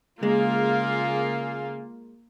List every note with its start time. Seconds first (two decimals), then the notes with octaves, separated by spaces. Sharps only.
0.23 C#3 G#3 A#3 F4 G#4 F5